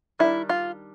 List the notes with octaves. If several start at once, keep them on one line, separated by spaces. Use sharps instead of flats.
D#3 G3 B3 D4 E4
F4